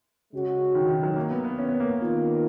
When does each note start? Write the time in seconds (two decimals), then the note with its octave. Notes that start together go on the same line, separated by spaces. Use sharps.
0.33 C#3 G#3 C#4 F#4
0.75 D#3
0.89 D#3
1.03 F#3
1.16 A#3
1.30 B3
1.45 B3
1.58 C#4
1.69 B3
1.80 A#3
1.90 B3
2.00 D#3 A#3 F4